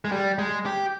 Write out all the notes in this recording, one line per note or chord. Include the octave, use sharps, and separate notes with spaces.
G#3
G3
G#3
G4